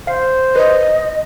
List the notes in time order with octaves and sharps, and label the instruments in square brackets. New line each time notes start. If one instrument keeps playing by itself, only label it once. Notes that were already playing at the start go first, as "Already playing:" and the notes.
[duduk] C5 [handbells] F5 C7
[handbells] B4 [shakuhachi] D#5